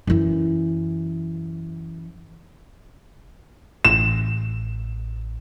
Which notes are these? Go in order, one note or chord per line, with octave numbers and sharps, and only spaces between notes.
F#2 E3
A1 E7